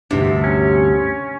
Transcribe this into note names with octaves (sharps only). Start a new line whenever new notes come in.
D2 G2 C3 D4
C#4